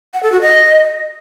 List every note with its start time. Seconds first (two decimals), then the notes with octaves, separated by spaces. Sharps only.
0.14 F#5
0.23 A4
0.32 F#4
0.41 D#5